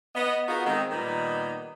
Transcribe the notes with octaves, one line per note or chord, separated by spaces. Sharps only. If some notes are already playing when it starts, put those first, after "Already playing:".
B3 D#5
B3 D#4 F4 F#4 G#4 A#4
D#3 G#3 C4
A#2 D#3 G3 B3 D#4